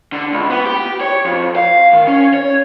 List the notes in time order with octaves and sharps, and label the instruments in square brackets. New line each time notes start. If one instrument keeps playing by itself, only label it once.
[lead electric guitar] D3
C#2
B3
G4
C#5
F2
F5
D#3
C#4
C#5